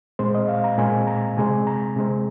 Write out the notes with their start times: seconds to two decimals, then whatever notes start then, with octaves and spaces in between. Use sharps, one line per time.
0.19 A#2 G#3 C4 C5
0.35 D#5
0.48 F5
0.64 A#5
0.78 A#2 G#3 C4 G#5
1.07 A#5
1.37 C3 G#3 C4 G#5
1.67 A#5
1.96 C3 G#3 C4